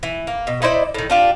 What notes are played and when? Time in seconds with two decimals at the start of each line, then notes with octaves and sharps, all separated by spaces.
0.03 E3
0.27 A#3
0.47 B2
0.62 D#4 E4 C5 D5
0.95 A2 D#3
1.10 D4 F4 G4